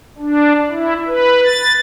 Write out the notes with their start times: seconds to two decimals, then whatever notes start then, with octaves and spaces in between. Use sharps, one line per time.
0.19 D4
0.71 E4
1.08 B4
1.45 A6